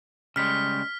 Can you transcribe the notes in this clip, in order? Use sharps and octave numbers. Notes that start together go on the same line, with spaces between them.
C#3 G3 G#3 F6 B6